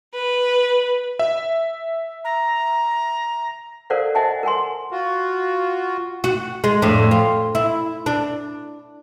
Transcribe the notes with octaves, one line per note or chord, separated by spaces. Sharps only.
B4
E5
A#5
A4 A#4 C5 D5 F5 F#5
C5 D#5 E5 F#5 G#5 A5
A#4 F#5 G#5 C6
F4 F#4
F#4
G#3
F2 A2 D4
F4
E4
D4